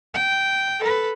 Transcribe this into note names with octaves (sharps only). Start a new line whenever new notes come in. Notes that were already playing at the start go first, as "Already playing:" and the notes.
G5
A4 B4